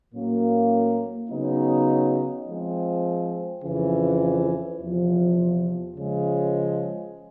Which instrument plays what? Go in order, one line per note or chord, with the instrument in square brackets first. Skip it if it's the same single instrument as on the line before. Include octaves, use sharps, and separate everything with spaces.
[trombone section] A2 F#3 A#3 C#4
C#3 F#3 B3 D#4
F3 G#3 C4
F2 C#3 E3
E2 C3 F3
C#3 F3 G#3